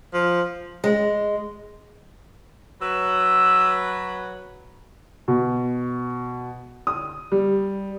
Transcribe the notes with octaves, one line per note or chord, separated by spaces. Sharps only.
F3
G#3
F#3 B4 E6
B2
D#6
G3